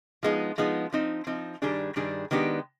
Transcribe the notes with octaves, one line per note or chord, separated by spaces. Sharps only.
F3 G#3 B3 D#4
F3 G#3 B3 D#4
F3 C4 D#4
F3 C4 D#4
G2 D#3 G3 D4 G#4
G2 D#3 G3 D4 G#4
D#3 G#3 B3 D4 G4